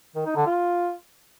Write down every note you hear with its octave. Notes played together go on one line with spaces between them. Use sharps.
D#3
D#4
D3
F4